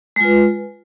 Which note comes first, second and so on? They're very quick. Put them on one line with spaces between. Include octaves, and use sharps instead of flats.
G#3 F4 B4